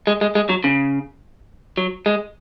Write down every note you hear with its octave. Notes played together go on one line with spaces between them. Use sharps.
G#3
G#3
G#3
F#3
C#3
F#3
G#3